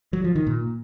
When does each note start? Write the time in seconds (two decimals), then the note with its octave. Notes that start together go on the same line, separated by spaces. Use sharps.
0.13 F#3
0.24 F3
0.35 D#3
0.47 A#2